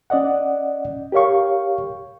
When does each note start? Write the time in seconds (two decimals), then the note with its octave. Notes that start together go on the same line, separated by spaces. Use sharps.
0.10 C#4 D5 D#5 F#5
1.12 G4 A#4 C#5 F5 C#6